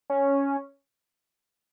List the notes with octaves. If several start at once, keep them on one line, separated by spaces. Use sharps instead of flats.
C#4